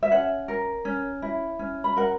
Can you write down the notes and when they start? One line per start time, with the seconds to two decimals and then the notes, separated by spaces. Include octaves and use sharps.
0.03 E5
0.11 C#4 F#5
0.48 A#4
0.85 C#4
1.22 E4
1.59 C#4
1.84 B5
1.97 A#4 F#5